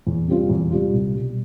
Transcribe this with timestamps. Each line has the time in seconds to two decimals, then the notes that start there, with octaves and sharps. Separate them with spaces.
0.07 E2
0.28 C3 G3 C4 F4
0.49 E2
0.70 C3 G3 C4 F4
0.93 C2
1.14 B2 G3